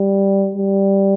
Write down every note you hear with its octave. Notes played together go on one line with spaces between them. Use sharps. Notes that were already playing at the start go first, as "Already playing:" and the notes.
Already playing: G3
G3